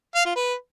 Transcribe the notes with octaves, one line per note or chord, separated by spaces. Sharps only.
F5
F4
B4